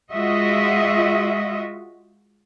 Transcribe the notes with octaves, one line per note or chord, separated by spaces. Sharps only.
G#3 F4 F#4 D#5 E5